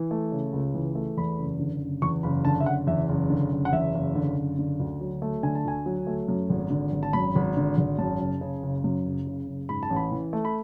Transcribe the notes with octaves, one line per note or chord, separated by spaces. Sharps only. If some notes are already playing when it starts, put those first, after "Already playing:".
Already playing: E3
A3
C#3
C#2
E3
A3
E2 B5
F#1
D3
F#1
E2 C#6
F#1 B5
D3 A5
E5
F#1 F#5
E2 E5
F#1
D3
F#1
F#5
E2 E5
F#1
D3
F#1
D3
D2
F#3
A3
D3 G#5
A5
D2 G#5
F#3
A3
F#2
G#1
D3
G#1
A5
F#2 B5
G#1
D3
G#1
F#2 A5
F#1
C#3
F#1
F#2
F#1
C#3
F#1
G#2 B5
A5
A1
B5
E3
A3
B5